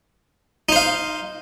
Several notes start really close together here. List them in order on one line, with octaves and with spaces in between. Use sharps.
D#4 C5 F5